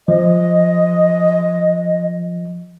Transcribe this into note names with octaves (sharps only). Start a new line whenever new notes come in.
F3 D#5